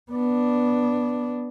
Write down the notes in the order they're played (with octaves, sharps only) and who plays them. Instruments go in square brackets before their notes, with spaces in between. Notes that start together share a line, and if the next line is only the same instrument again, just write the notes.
[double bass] B3 D4